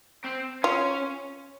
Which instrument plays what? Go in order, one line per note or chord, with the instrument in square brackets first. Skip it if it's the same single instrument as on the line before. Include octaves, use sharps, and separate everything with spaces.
[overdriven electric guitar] C4
[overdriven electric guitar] C#4 [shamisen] F4